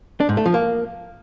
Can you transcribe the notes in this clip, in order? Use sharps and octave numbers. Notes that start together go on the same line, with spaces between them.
D4
G#2
A3
F3
A#3